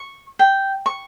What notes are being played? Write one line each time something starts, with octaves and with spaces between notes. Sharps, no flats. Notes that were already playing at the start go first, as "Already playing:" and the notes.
Already playing: C#6
G5
C#6